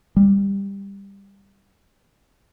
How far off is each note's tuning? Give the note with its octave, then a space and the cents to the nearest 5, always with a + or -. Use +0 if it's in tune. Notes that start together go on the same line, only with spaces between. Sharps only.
G3 +15